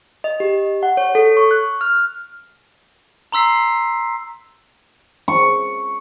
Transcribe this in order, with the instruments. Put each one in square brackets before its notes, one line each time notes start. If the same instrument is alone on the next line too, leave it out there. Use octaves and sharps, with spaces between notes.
[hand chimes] D#5
G4
F#5
C#5
A4
C#6
F#6
F6
[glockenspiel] A#5 C6 E6 B6 C7
[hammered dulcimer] C#6